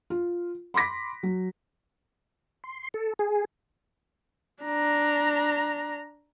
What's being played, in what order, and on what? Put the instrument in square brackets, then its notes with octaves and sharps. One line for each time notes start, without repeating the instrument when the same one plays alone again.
[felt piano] F4
B5 C6 D6 A#6 B6
F#3
[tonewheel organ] C6
A4
G#4
[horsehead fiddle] D4 A#5